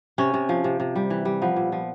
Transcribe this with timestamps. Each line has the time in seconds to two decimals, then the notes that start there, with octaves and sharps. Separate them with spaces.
0.18 C3 C#4
0.34 C3
0.49 F3
0.64 C3
0.80 C3
0.96 G3
1.10 E3
1.25 G3
1.42 F3 B3
1.56 A#2
1.72 F3